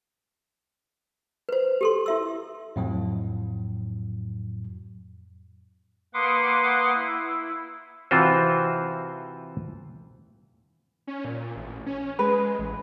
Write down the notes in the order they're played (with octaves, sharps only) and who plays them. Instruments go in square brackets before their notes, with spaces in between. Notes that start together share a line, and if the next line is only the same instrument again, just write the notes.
[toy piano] B4 C5
G4 A4 C6
E4 E5 E6
[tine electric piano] F2 A2 F#3
[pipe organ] A#3 B4 F#5 C6 D6 D#6
E4
[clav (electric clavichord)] C3 E3 C4 F4 F#4 C5
[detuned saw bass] C#4
A#2
A1
C#4
[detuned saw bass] G#3 [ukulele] B4
[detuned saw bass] A1